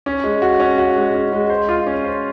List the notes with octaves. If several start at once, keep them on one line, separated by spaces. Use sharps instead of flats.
C#4
G#3
F#4
C#4
F#4
G#3
C#4
G#3
C5
F4
C#4
C5